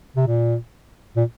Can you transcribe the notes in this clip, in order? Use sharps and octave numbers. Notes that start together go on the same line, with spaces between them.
C3
A#2
A#2